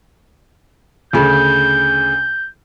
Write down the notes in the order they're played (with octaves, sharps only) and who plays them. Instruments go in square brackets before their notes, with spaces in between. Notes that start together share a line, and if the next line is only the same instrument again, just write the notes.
[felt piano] D2 C#3 [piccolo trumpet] G6